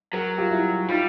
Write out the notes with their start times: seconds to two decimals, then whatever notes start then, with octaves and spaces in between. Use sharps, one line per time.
0.13 F#3 G#4 A#4
0.38 F4 G4
0.51 E4 F#4
0.88 G3 D#4 F4